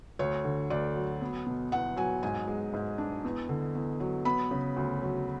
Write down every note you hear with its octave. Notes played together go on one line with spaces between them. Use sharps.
D2 C#5
D3
D2 D5
F#3
B3
B2
E2 F#5
F#3 G#5
G#2 G#5
G#3
G#2
D4
E2
D3
E2
F#3
B3 B5
C#3
D2
F#3